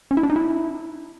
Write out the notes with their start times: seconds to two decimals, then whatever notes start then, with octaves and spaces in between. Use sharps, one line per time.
0.11 C#4
0.17 E4
0.23 D4
0.30 D#4
0.36 E4